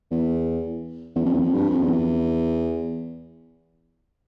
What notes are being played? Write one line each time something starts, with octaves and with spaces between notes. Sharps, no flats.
E2
E2
F2
E2
F2
G2
F2
E2